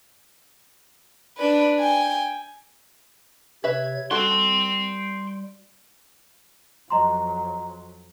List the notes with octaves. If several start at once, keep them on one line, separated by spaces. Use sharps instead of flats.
D4 B4
G5 G#5
C3 B4 C#5 E5 G#6
G3 F#4 A4 G5 C6
F2 F#3 D#5 A#5 C6